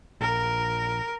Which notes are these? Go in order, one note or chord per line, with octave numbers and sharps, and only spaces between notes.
A#1 A#4